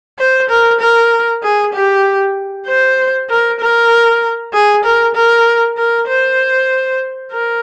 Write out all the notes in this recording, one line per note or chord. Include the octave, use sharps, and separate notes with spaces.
C5
A#4
A#4
G#4
G4
C5
A#4
A#4
G#4
A#4
A#4
A#4
C5
A#4